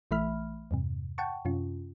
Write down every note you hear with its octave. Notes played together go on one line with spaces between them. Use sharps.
A#1 E3 A3 E5 B5 F6
E2 G2 C3
F#5 G5 A5 C#6
F#2 C3 C#4 F4